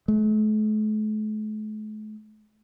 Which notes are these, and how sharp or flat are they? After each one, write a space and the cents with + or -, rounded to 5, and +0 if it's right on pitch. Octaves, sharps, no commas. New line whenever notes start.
A3 -45